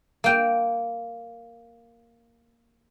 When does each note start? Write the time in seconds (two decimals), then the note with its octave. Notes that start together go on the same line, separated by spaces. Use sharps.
0.24 A#3 G5